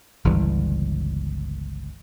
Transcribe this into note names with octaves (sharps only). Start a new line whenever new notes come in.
G1 C#2 E3 G3